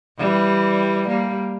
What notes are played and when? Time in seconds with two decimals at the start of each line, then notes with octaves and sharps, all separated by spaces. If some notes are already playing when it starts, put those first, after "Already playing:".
0.18 E3 G3
1.08 G3 A#3